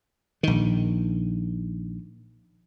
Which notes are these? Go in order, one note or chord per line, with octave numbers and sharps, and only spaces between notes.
A#1 D#3